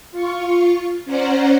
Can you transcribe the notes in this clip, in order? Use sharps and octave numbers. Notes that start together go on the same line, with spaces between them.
F4 C#6
C#4 C5 D5 F#5 A#5